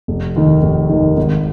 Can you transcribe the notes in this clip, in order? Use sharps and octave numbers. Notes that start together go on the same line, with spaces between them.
F1
D#2 D#3
F1
D#2 D#3
G#1